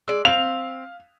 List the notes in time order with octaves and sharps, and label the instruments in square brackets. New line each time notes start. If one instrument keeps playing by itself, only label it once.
[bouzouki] G#3 D5 [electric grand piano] E6
[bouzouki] C4 [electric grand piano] F5 [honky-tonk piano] F7